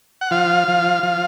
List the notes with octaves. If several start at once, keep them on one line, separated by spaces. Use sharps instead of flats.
F#5
F3 F5
F3
F3